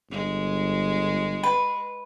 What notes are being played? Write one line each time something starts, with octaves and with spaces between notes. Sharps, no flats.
G1 G#3
B4